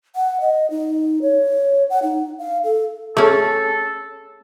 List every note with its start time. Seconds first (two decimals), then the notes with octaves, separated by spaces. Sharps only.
0.16 F#5
0.40 D#5
0.70 D#4
1.22 C#5
1.90 F#5
2.03 D#4
2.39 F5
2.64 A4
3.17 A3 C#4 G#4 A4